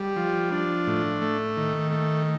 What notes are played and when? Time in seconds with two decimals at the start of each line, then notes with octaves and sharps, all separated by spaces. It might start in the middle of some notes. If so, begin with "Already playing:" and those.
Already playing: G3
0.16 F3
0.52 D4
0.87 A2
1.22 A3
1.57 D#3
1.91 A3